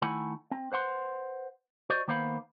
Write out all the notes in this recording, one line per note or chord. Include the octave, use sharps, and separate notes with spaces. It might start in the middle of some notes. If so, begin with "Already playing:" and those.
D#3 A3 E4 F#5 G#5 B5
C4
B4 C5 F#5 C6
F#4 C5 D5 D#5
D#3 A#3 B3 C5 F5 B5